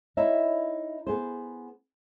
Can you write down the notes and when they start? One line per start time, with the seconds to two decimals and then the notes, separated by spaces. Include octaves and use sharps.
0.17 D#4 E4 C#5 E5
1.07 B3 G#4 C5